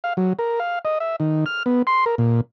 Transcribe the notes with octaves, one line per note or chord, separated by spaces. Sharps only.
F5
F#3
A#4
F5
D#5
E5
D#3
F6
B3
C6
A#4
A#2